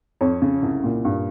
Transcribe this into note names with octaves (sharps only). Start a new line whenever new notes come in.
F2 C#5
C#3
C2
A#2
G2